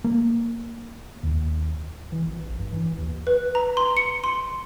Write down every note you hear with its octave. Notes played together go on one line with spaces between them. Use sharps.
A#3
D#2
E3
G#1
A#1
G2
E3
D#2
B4
A#5
C6
C#7
C6